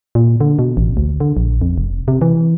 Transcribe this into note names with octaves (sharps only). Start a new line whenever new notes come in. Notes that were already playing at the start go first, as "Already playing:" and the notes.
A#2
D3
B2
A1
D2
D3
A#1
F2
F1
C3
E3